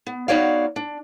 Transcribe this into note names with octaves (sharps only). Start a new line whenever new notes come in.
B3
B3 D#4 F#4 C#5 D5 F5
D4